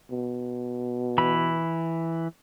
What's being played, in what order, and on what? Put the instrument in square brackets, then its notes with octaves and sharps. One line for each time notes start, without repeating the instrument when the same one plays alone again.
[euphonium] B2
[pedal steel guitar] E3 B5